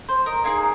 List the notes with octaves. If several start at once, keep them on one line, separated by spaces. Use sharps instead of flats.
C5
A#4 D#5
A#3 D#4 G#4 G#5 C6